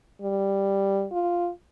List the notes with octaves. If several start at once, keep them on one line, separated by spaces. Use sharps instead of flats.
G3
F4